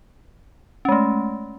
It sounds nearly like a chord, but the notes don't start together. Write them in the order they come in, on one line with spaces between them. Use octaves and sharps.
C#4 G#3 A3